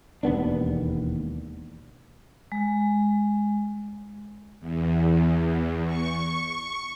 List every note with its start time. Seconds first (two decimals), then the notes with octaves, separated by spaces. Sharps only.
0.23 E1 D#2 B3 D4
2.52 G#3
4.60 E2
5.86 C#6